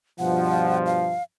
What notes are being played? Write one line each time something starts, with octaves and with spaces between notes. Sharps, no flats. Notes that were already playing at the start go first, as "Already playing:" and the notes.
G2 B2 F3 F#5
F5